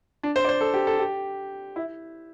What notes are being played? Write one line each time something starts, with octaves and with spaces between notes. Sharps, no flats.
D4
C5
D5
C5
A4
G4
A4
G4
E4